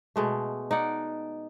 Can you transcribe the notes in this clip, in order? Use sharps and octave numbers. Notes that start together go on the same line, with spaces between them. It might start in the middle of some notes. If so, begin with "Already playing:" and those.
B2 G#3 A3
D#4 D5 F#5